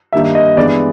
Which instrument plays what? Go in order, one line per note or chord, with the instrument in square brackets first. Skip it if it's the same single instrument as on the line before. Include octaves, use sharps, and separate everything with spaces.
[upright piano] G2 D#3 G3 A#3 D#4 E5
D#5
G2 E3 G#3 B3 D5